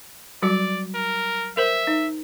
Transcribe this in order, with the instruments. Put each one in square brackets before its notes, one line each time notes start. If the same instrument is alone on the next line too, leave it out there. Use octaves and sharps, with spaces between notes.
[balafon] F#3 G3 F#4 [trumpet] D5
[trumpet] A#4
[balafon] A#4 C5 [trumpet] E5
[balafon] D#4